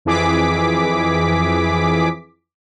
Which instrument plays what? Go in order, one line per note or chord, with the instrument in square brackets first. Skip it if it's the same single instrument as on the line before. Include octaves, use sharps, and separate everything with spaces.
[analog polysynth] F2 E3 G#4 D6 B6